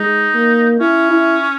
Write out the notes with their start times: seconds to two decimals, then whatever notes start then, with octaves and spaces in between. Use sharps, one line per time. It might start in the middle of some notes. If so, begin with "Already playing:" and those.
Already playing: G#3 D#4
0.34 A#3
0.80 C#4 E4
1.11 E4